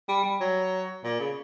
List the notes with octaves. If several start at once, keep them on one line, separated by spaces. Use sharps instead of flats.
G3
G3
F#3
A#2
C#3